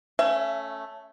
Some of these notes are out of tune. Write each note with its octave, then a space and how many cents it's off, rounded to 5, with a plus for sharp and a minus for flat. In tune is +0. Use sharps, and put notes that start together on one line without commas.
A3 +0 C#4 +0 E5 +35